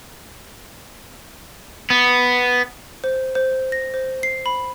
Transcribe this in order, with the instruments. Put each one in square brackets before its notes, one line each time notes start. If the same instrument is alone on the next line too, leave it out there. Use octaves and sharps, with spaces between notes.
[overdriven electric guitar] B3
[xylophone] C5
C5
A#6
C5
C7
B5